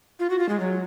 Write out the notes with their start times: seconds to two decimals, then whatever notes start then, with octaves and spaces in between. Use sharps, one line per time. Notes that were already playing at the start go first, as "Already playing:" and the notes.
0.19 F4
0.30 F#4
0.39 F4
0.49 G#3
0.60 F#3